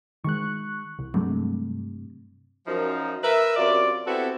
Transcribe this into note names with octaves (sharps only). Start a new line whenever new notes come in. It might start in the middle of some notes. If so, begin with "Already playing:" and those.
D#3 G#3 C#6 F#6
C2
G2 C3 F#3 G#3 A3
F#2 F3 D#4
A#4 B4 E5
F#2 C3 F4 D5
B3 C4 E4 F#4 G4 A4